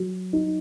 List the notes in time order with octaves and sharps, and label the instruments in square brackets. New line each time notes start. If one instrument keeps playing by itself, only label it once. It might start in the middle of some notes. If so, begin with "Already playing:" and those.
Already playing: [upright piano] F#3
D#4